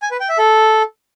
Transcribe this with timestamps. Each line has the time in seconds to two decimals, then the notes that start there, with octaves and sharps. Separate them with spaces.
0.02 G#5
0.11 B4
0.20 G5
0.29 E5
0.38 A4